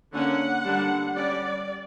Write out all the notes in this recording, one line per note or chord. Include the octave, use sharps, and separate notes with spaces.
D3 A#3 C#4 F#5
D3 G3 A#3 D4
G3 C#4 D5